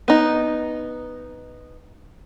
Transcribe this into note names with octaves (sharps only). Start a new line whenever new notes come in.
B3 D#4